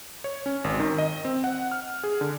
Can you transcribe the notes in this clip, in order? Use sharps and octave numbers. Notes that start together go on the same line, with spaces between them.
C#5
C#4
G#1
D#3
D#5
C4
F#5
F6
G#4
D3